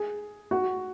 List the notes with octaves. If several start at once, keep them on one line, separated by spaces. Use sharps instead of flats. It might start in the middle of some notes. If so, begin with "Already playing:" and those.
Already playing: G#4
F#4